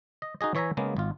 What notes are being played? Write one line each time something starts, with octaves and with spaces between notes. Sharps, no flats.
D#5
D#4 F#4 G#4 D#5
E3 C#5 E5 G#5 A#5
C#3 G#3 A#3 B3
G#1 F4